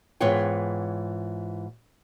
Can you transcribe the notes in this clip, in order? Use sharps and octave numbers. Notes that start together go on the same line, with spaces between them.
G#2 E3 B3 F4 C#5 G5